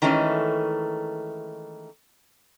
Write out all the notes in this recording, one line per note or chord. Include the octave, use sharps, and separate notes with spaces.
D#3 E3 G#3 A3 C#4